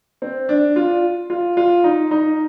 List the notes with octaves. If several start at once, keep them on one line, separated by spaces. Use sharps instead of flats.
C4
D4
F4
F4
F4
D#4
D#4